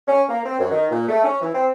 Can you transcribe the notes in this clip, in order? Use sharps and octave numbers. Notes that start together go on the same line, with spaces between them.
C#4
A#3
C4
F#2
D#3
A#2
A3
C#4
E3
C4